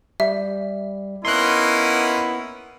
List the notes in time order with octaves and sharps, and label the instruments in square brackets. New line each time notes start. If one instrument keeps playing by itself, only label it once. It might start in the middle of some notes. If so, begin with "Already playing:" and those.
[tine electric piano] G3 [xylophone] E5
[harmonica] A#3 C#4 D#4 [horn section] B3 E4 [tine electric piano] C6 F#6